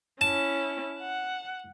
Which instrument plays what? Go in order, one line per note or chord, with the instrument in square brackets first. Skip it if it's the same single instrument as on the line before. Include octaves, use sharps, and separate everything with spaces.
[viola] C#4 E4 [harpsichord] A5
[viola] F#5